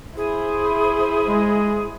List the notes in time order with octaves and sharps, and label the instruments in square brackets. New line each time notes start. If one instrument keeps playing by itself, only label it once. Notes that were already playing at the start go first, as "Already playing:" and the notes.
[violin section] E4 C5 [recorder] G#4
[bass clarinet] G#3